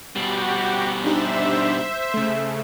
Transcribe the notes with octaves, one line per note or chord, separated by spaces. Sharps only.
B2 G3 F#4 G4
D4 D#4 G4 C5 E5
C#3 A3